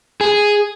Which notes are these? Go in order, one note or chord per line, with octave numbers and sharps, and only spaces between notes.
G#4